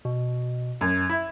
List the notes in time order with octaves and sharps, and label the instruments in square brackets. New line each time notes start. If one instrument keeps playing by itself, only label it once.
[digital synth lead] B2
[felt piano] F#2 [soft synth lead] G#6
[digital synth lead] E4 [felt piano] E5